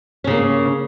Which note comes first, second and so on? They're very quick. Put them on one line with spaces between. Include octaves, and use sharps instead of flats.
C#4 C#3 A#3